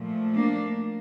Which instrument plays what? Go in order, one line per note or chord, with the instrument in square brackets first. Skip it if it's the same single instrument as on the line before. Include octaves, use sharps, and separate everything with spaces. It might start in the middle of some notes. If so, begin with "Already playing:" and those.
Already playing: [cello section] A#2 F3 A3
A#3 D4